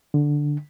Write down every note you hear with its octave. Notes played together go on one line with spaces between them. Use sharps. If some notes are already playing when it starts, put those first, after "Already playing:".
D3